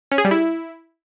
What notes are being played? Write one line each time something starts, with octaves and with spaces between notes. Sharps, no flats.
C#4
G#4
G3
E4